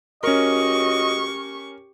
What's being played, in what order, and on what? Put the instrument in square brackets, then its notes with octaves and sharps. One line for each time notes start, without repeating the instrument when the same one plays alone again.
[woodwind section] C#2 F#4 [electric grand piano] C#4 A#4 [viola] G4 C#6 [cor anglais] D#5